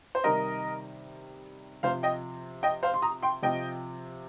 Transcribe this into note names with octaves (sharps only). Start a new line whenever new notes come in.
C5
C3 D#3 G3 A#4 D#5
C3 F3 C5 F5
D#5 G5
D#5 G5
C5 F5
C6
A#5 D#6
G5 C6
C3 F3 D#5 G5